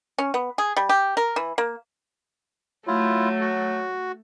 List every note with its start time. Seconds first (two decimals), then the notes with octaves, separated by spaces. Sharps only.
0.18 C#4
0.34 B3
0.58 G#4
0.77 G3
0.89 G4
1.17 A#4
1.36 E3
1.58 A#3
2.87 F#3 A3 E4 F4
3.41 F#4